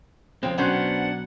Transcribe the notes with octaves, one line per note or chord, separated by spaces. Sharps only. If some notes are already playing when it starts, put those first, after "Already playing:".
C#3 F3 G#3 C4 G5
B1 B3 C#4 D4 C5 F#5